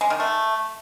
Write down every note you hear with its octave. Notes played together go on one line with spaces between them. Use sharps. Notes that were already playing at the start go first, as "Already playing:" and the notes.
G#3
D#3
A3